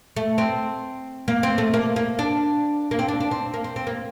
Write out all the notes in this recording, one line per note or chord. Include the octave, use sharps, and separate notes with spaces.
A3
C4
A#3
C4
A3
A#3
A#3
D4
A#3
C4
D4
D4
C4
A#3
C4
C4
A#3